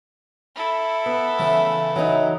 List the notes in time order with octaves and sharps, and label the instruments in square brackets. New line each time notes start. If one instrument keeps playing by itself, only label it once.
[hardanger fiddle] E4 A4
[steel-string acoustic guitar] B3
[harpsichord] C#3 E3 A3
[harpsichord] E3 [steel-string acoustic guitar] F#3 D#4